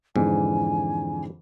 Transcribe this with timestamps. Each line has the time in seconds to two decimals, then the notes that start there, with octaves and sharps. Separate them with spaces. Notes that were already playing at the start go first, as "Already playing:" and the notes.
0.16 F2 G#2 D3 E3 G#5